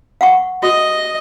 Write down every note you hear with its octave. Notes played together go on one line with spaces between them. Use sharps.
F5 F#5 C#6
F#4 D#5